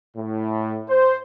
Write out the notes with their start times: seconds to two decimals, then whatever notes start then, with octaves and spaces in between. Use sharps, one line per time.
0.17 A2
0.89 C5